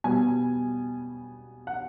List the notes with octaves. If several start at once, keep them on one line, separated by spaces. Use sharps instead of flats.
B2 G3 B3 G#5
F#5